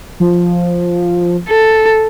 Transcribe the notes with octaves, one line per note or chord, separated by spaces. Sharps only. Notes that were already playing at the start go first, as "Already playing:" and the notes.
F3
A4